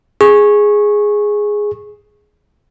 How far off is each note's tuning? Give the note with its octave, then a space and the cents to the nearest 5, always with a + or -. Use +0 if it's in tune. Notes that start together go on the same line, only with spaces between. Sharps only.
G#4 +0 C#6 -15